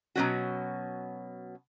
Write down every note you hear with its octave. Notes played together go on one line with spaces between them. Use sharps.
B2 F#3 A#3 C#4 F#4